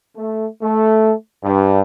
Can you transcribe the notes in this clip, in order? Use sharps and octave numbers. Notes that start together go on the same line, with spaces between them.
A3
A3
G2